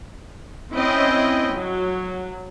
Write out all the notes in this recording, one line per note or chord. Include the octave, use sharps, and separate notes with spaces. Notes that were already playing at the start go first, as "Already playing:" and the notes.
C4 C#4 E4 D#5 G5
F#3